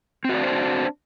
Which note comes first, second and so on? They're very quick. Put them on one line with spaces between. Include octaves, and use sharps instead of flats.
C4 F#4 D5 D4 C5